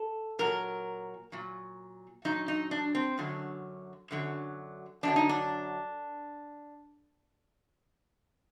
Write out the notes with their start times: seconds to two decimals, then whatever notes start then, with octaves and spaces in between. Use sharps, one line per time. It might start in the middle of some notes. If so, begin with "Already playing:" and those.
Already playing: A4
0.39 A#2 F#3 A#4
1.32 A#2 F#3
2.25 A#2 F#3 D#4
2.48 D#4
2.71 D4
2.95 C4
3.18 F#2 D3 F#3
4.11 F#2 D3 F#3
5.03 F#2 D3 F#3 D4
5.16 D#4
5.29 D4